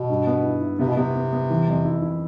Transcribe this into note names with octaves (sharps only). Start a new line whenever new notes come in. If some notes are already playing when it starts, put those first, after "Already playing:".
Already playing: B2
G2
B3
E4
E4
C3 B3
B2
C3 B3
B3
B3
E3
F2
E4
E4